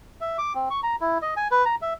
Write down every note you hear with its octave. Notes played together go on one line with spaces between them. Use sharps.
E5
D6
C4
C#6
A#5
E4
D#5
G#5
B4
A#5
E5